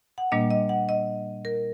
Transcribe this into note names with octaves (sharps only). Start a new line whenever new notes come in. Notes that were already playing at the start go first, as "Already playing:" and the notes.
F#5
A#2 G3 A#3 D4 D#5
D#5
F#5
D#5
A#4